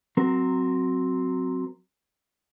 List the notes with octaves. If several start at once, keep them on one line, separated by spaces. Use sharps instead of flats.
F#3 C4 A#4